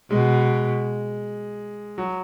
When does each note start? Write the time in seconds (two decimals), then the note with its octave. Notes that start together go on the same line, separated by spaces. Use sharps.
0.11 B2 G#3
1.98 F#3